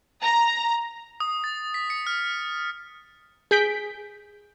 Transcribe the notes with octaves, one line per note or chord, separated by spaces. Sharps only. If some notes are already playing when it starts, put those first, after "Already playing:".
A#5
D#6
A6
B6
C#7
F6
G#4 G6 B6 D7